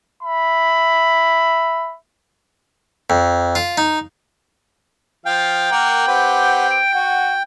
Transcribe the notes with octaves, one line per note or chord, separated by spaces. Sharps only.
E5 B5
F2
F4
D#4
F3 F5 G5
A#3 A#4 F#5
C4 G4 B4 F#5
D7
F#4 F#5